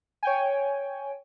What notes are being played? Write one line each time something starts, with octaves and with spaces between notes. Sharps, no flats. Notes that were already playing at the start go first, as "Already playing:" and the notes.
C#5 G5 G#5